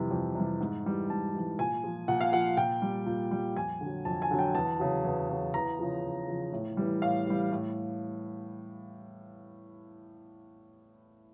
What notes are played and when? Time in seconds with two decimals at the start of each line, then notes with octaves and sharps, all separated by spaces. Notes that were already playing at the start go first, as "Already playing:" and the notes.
Already playing: F2 C3 E3 G3
0.11 F2
0.35 C3 E3 G3
0.60 G#2
0.85 E3 G3
1.10 G#2 A5
1.34 E3 G3
1.59 A#2 G#5
1.84 F3
2.08 A#2 F#5
2.21 F5
2.32 F3 F#5
2.57 A#2 G5
2.82 G3
3.06 A#2
3.31 G3
3.56 F2 G#5
3.81 D3
3.86 F#3
4.05 F2 A5
4.22 G#5
4.31 D3 F#3
4.39 G5
4.55 E2 A5
4.80 C#3 F#3
5.05 E2
5.29 C#3 F#3
5.54 E2 A#5
5.79 C#3 F3
6.03 E2
6.28 C#3 F3
6.53 A2
6.77 E3 G3
7.01 A2 F5
7.27 E3 G3
7.51 A2